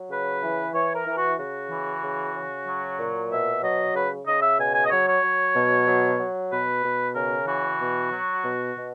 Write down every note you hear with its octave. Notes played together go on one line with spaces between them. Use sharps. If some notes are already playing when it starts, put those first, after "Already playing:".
Already playing: F#3
C#3 B4
E3
E3 C#5
A#4
E3
F#4
C#3 F#4
E3
C#3
C#3
F#3
A#2
B2 E5
F#3 D#5
C#3 B4
C#3 D#5
E5
B2 G#5
G#5
D#5
F#3 C#5
C#5
F#3
B2
F#3
F#3
B2 B4
B2
C#3 A#4
E3 F#4
B2
F#3
B2
B2